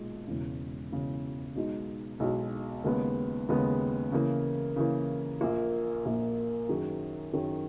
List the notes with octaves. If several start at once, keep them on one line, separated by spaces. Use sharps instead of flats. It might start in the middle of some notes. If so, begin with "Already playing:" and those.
Already playing: B1 A#2 G#3
E1 E2 C#3
E1 E2 C#3
B1 B2 G#3 D#4
B1 B2 G#3 D#4
D#2 C#3 G#3 B3
D#2 C#3 G#3 B3
C#3 E3 A#3
C#3 E3 A#3
A#1 A#2 A#3
A#1 A#2 A#3
F#2 D#3 F#3 C#4 G#4
F#2 D#3 F#3 C#4 G#4